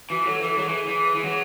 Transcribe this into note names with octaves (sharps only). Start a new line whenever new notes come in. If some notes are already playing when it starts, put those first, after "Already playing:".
E3 F#4
F#3 A4
E3 A4
F#3 G#4
E3
E3
E3
F#3